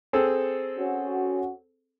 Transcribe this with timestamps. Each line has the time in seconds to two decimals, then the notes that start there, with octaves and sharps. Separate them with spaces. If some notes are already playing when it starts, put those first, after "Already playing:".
0.13 C4 G#4 A4
0.78 C#4 F#4